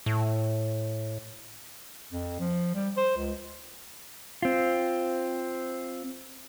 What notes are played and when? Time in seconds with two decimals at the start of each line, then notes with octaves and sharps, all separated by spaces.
0.06 A2
2.12 F2
2.39 F3
2.74 G3
2.97 C5
3.17 C#2
4.42 C4 F4